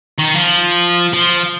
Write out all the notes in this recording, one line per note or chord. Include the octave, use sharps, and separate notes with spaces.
D#3
F3
F3